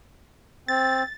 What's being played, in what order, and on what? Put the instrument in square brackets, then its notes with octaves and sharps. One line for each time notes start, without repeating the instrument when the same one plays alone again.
[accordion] C4 [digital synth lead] A6